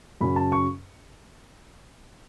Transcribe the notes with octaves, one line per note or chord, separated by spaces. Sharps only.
F#2 C#3 F#3 C#4 B5
A5
C#6